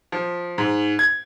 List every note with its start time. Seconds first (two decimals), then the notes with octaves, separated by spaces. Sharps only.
0.12 F3
0.58 G#2
0.99 G#6